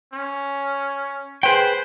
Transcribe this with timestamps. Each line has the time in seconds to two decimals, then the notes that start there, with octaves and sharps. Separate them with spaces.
0.13 C#4
1.43 G#4 B4 C5 G5